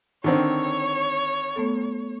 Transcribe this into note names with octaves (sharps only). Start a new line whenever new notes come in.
D3 D#3 C4 C#5
A3 B3 A4